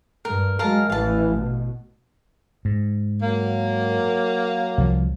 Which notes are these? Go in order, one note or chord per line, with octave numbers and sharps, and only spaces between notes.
G2 A#4
F#3 G#3 A#4 F5 A5
A1 E3 F5 A5
B2
G#2
F#3 A#3
C2 F3